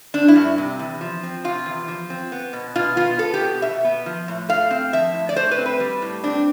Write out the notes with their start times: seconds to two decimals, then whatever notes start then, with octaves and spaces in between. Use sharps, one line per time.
0.14 C4 D4
0.28 E4
0.36 G2
0.58 C3
0.79 E2
1.01 F3
1.23 C4
1.44 C3 F4
1.66 E2
1.88 F3
2.10 C4
2.32 B3
2.53 B2
2.75 B2 F4
2.97 B3 F4
3.19 B3 A4
3.34 G4
3.40 B2
3.62 B2 E5
3.84 B3
4.06 F3
4.28 A2
4.49 A3 F5
4.71 C4
4.93 F3 E5
5.14 A2
5.29 D5
5.36 A3 C5
5.51 B4
5.58 C4
5.66 B4
5.80 G3
6.02 A2
6.23 C4 D4